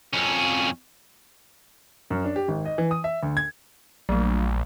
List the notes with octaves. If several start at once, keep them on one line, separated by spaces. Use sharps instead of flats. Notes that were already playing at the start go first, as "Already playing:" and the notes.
F2 C#4
F#2
D4
G4
G#1
D#5
E3
D#6
E5
D2
G#6
A#1 F#3 A3